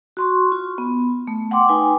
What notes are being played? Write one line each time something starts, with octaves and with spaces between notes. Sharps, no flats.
F#4 C6 C#6
F4
B3
A3
F#5 G5 C6 D6
D#4 B4 G5 G#5